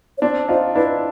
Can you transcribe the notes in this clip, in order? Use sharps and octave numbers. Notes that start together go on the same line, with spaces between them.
C#5
C4 D4 D5
D#4 F4 C5
D4 E4 B4